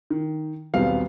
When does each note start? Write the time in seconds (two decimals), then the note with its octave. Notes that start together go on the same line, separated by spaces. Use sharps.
0.10 D#3
0.74 D#1 B1 B3 C4 F5